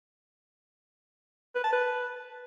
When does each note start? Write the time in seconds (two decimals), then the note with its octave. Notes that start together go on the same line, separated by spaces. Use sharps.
1.55 B4
1.64 A5
1.72 B4